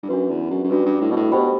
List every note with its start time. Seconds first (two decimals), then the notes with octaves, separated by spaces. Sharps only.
0.03 G2
0.09 F#2 D4 F#4 B4
0.30 E2
0.51 F#2
0.64 F#2
0.71 G2 D4 F#4 B4
0.86 G2
1.01 A2
1.11 B2
1.16 A2
1.32 B2 G4 C5 G5 B5